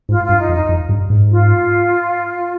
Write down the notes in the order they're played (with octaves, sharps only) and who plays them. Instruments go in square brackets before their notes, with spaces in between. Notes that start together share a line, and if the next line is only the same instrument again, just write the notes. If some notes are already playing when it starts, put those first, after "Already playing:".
[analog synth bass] G#2 [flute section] F4
[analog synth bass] G2 [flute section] F4
[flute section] D#4
[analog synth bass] F2
[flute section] D#4
[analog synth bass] F2
G2
G#2
[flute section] F4